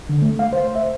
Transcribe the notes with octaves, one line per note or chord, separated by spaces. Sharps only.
D3
A3
F5
C5
E5